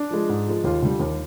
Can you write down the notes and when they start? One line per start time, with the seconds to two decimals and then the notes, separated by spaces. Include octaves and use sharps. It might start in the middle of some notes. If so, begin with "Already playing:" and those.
Already playing: D4
0.11 F3 G#3
0.29 G#2
0.47 F3 G#3
0.64 D#2 F4
0.82 D3 G3
0.99 D#2